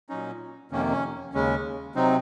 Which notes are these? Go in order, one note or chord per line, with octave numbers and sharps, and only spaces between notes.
A#2 F#3 C#4 D#4
F2 C3 D#3 A#3 C#4
C#4
D#2 C#3 G#3 C#4
C3 F#3 C4 D#4